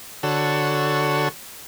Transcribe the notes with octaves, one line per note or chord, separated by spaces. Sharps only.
D3 F#4 A4 C#5